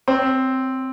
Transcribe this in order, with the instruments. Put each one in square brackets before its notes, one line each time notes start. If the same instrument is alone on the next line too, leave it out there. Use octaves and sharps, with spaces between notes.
[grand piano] C4